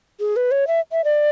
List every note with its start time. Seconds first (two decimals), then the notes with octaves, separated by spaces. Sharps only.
0.20 G#4
0.36 B4
0.51 C#5
0.67 E5
0.92 E5
1.04 D5